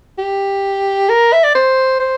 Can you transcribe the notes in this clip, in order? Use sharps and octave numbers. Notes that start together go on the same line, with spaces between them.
G4
A#4
E5
D5
C5
C5